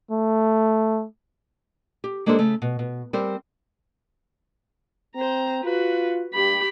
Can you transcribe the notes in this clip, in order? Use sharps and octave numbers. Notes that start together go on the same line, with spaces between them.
A3
G4
G#3 A#3 D4 G4 A4 C5
C#3 A3
B2
B2
G3 C4 A#4 C5
C4 C5 A#5
F4 F#4 B4
G2 G4 B5